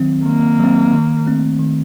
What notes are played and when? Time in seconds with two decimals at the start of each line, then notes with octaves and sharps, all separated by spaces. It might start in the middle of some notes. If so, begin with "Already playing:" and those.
Already playing: D#3 F#3 C4
0.26 D#3 A#3
0.60 F#3 C4
0.93 D#3
1.27 A3 C4
1.59 D#3